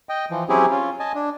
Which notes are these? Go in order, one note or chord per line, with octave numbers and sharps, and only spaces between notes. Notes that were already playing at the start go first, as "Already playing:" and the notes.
D#5 G5
E3 F3
F#3 C4 C#4 E4 G4 G#4
C#4 F4
D#5 G#5 A5
D4